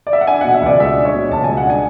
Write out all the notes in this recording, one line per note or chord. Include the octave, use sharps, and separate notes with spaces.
D5
E5
F#5
D4 G#5
B2 F#5
E5
C#2 D5
G#3 E5
D4
C#5
B2
C#2 A5
G#3 G#5
F#5
D4 G#5